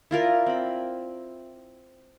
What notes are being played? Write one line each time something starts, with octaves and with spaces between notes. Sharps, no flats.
E4 F4 A#4 D5
C4 B5